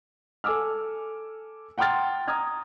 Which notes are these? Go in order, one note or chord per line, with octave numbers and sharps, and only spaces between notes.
A4 G#5 D6 E6 F6
F#5 G5 A#5 C6 F6 A6
A#5 D#6 F6 G#6